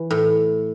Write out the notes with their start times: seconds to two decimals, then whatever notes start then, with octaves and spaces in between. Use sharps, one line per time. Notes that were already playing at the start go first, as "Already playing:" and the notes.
Already playing: E3
0.10 A2